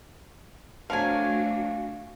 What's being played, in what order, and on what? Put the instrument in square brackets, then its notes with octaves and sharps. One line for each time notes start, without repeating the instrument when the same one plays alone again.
[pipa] F3 F#3 [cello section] A3 D4 F#4 [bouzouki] F5 G#5